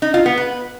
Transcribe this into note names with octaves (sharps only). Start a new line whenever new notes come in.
D#4
F4
B3
B4